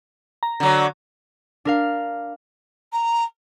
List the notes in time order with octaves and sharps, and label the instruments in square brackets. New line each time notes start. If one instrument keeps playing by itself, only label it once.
[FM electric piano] A#5
[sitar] D3 F#3
[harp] D4 A#4 F5
[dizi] A#5